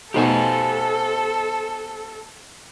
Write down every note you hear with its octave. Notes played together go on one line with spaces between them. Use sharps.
B2 A3 D#4 G4 A4 C5 G#5